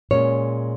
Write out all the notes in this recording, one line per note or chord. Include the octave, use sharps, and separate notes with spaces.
A#2 G#3 C#4 C#5